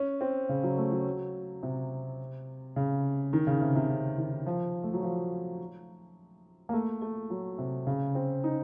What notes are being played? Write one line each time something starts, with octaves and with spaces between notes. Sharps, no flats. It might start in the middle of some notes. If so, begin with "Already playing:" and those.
Already playing: C#4
C4
C#3
F#3
A3
F#3
C3
C#3
D#3
C#3
C3
C3
C#3
D#3
F3
A3
F#3
F3
A#3
A3
A3
F#3
C3
C#3
C4
D#4